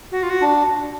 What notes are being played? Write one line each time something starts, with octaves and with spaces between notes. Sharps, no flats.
F#4
F4
F#4
D4